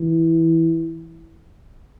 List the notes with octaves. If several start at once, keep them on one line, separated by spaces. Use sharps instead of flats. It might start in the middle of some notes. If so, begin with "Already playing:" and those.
Already playing: E3